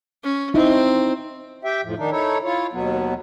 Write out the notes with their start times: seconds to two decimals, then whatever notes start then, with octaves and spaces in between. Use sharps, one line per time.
0.23 C#4
0.54 C4 D#4 E4
1.64 G4 E5 G5
1.84 F2 A2 F3
1.98 D#3 D4 D#4
2.11 D#4 E4 A4 C#5
2.44 E4 F4 C#5
2.73 D#2 B2 F#3 B3